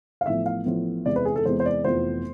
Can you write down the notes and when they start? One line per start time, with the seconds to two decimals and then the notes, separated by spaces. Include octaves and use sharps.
0.21 F5
0.26 A1 A2 F3 B3 E5
0.46 F5
0.66 A1 A2 F3 B3
1.05 E2 C3 G#3 D5
1.16 B4
1.25 G#4
1.36 A4
1.45 E2 C3 G#3 C5
1.60 C5
1.66 D5
1.85 F1 F2 E3 B3 F4 C5